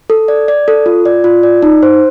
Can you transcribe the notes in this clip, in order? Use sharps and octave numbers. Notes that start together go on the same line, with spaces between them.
A4
D5
D5
A4
F4
D5
F4
D5
D#4
C5